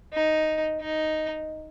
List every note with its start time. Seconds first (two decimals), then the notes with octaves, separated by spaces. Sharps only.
0.13 D#4
0.81 D#4